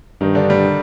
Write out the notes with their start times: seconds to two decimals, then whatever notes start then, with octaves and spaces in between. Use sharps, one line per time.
0.21 G2 D#3 D#4
0.35 D3 D4
0.50 G3